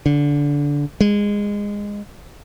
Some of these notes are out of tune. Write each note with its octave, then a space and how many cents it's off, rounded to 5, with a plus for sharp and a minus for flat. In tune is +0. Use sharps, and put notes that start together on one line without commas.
D3 -20
G#3 -20